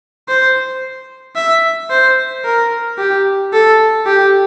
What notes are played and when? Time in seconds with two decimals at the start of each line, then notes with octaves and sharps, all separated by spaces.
0.28 C5
1.36 E5
1.90 C5
2.45 A#4
2.98 G4
3.53 A4
4.06 G4